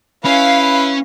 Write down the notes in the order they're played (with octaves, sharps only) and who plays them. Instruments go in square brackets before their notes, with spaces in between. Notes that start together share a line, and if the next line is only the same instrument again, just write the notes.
[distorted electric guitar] C#4 [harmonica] E4 B4 [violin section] F5